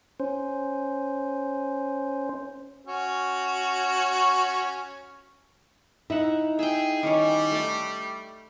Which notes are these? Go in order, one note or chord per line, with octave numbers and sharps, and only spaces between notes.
C#4 C5
C#4 F#4
D#4 E4 E5 F#5
G#4 E5 G5
D#3 G3 C#4 C#5
A3 D5